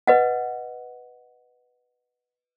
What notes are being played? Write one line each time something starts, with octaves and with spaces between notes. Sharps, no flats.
B4 D#5 F#5